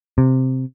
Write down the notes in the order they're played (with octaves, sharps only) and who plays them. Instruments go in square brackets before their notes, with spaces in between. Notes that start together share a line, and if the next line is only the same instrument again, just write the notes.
[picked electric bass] C3